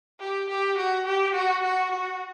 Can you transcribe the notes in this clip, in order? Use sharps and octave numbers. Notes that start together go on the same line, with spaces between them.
G4
G4
F#4
G4
F#4
F#4
F#4